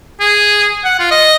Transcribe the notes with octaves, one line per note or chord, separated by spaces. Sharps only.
G#4
F#5
F4
D#5